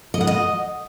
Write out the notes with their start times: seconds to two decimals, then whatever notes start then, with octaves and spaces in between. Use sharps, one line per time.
0.14 D#5
0.21 F#5
0.27 D#5